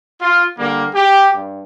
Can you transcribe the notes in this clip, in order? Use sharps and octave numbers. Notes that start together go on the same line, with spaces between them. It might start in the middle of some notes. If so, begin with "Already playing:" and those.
F4
D3 G3 A#3
G4
G2